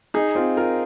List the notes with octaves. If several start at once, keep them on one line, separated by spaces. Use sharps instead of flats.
D#4 G#4
C4 F4
F4 A#4